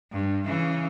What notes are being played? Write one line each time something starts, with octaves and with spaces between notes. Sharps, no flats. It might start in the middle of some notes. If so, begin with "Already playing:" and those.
G2
C#3 E3